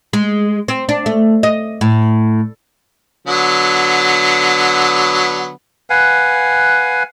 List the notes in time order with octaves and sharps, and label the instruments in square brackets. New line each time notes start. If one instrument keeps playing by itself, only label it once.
[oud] G#3
C4
D4
A3
D#5
A2
[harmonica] D3 F#3 B3
[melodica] B4 F5 F#5 G#5